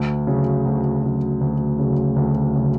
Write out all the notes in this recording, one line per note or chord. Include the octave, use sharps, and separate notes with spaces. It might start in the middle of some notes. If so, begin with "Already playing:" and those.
Already playing: D2
C#3 F#3
D2
C#3 F#3
D2
C#3 F#3
D2
C#3 F#3